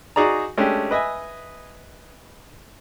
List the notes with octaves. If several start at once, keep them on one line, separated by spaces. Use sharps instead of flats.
D#4 F#4 G#4 D5 A#5
G#3 A3 C#4 D4 G4
B4 D#5 E5 G#5